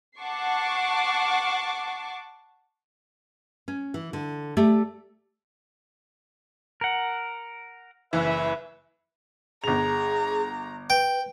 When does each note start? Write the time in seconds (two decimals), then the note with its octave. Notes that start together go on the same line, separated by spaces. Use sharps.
0.19 F#5 A5 C#6 D6 C7
3.68 C#4
3.94 E3
4.13 D3
4.57 A3 G4 D5 E5
6.81 A#4 F#5
8.13 F#1 E3 B4 E5
9.64 G1 G#4 A#5 F7
10.90 B4 G5